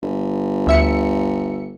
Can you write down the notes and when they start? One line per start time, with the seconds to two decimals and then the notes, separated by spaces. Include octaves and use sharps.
0.03 G1
0.67 D2 E5 C#7